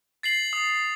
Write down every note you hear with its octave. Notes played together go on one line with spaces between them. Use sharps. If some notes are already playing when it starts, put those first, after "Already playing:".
A6 C7 F#7
D#6